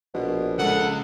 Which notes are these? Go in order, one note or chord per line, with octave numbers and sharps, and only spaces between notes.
A#1 B2
C#3 G#3 A4 F#5